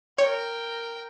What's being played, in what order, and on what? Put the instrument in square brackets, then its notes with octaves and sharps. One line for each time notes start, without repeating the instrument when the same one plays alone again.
[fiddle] A#4 G5 [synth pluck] C#5